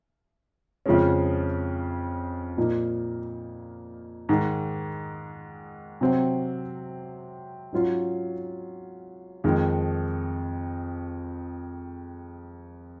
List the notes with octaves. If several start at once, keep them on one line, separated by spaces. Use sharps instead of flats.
F2 C#3 F3 G#3 C#4
A#2 F3 A#3 D#4
G#2 D#3 G#3
C3 F#3 C4
G#2 F#3 C#4 F4
F2 D#3 G#3